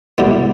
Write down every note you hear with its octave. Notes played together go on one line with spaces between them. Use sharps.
B1 B2 G3 B3 E4